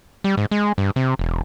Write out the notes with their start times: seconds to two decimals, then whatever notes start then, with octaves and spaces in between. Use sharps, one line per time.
0.24 G3
0.37 G#2
0.51 G#3
0.78 G2
0.96 C3
1.19 E1